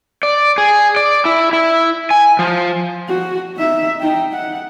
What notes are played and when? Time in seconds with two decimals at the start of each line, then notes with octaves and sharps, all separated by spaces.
0.23 D5
0.58 G#4
0.96 D5
1.25 E4
1.53 E4
2.11 G#5
2.39 F3
3.08 F#4
3.57 D#4 E5
4.00 D#4 G5
4.32 F#5